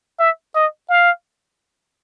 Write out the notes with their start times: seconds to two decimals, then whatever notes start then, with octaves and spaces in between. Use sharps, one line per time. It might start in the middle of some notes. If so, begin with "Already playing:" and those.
0.19 E5
0.55 D#5
0.89 F5